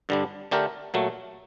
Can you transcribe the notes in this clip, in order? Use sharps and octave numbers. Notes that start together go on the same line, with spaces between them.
G2 D3 G3 D4
D3 A3 D4 G4 A#4
A#2 F#3 A3